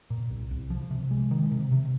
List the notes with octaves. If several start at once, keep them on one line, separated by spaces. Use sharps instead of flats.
A#2
C2
C2
F3
C3
G#3
D#3
C3
C3